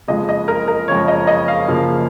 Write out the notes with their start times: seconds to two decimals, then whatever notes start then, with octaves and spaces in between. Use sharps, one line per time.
0.08 F#1 F2 C#3 F3 G#3 D#5
0.29 D#5
0.48 A#4
0.68 A#4
0.88 F#1 F2 C#3 F3 G#3 C#5
1.08 D#5
1.27 D#5
1.48 F5
1.68 F#1 F#2 C#3 F3 A#3